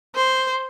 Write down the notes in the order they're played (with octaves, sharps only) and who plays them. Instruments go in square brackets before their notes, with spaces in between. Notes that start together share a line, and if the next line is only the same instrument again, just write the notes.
[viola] C5